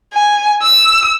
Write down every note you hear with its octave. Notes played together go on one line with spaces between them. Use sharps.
G#5
E6